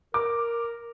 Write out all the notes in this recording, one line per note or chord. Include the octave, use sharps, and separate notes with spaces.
A#4 D6